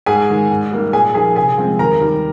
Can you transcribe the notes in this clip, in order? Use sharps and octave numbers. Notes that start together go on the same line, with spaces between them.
G#2 G#4 G#5
D#3 G#3
G#2
G3 A#3 D#4
A#2 G#4 G#5
F3 A#3 D#4 G#4 G#5
C3 G#4 G#5
F3 G#3 C4
D#2 A#4 A#5
D#3 G3